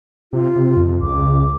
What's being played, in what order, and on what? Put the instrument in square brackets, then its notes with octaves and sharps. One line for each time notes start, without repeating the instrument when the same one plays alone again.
[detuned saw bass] C3 [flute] F4
[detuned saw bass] C3
F2
[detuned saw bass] C#2 [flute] D6